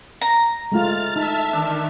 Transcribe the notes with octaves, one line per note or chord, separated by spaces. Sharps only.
A#5
G#3 A3 F4 F6 A6
D#4 A4 E5
D#3 D4